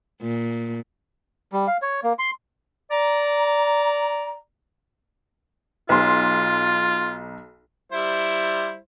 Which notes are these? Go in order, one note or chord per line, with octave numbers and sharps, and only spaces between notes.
A#2
G3
F5
C#5
A#3
C6
D5 A#5
B1 F4 C6
G3 E4 C5